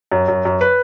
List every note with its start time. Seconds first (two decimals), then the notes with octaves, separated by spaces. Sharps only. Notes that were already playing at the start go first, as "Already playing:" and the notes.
0.12 F#2
0.28 F#2
0.45 F#2
0.61 B4